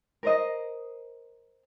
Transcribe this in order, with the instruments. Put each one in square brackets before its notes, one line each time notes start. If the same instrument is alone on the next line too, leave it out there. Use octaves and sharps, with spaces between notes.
[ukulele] A#4 C5 D#5